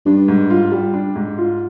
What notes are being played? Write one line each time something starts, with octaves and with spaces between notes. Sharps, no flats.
G2 D4
G#2
F4
G3
D4
G#2
F4